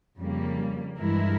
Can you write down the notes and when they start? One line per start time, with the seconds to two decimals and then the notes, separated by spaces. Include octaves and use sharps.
0.19 F2 C#3 G3 A#3
0.98 G2 E3 G#3 E4 A#4